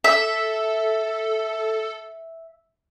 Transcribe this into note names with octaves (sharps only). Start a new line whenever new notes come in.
A4 E5